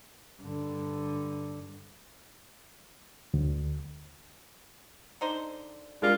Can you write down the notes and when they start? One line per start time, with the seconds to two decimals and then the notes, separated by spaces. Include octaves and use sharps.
0.42 G2 D3
3.34 D2
5.21 D3 D#4 C5
6.02 G3 G#3 D4 F4 A#4